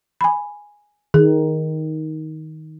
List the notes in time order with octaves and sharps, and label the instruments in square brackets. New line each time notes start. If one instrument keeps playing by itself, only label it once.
[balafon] G#5 B5
[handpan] D#3 [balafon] G#4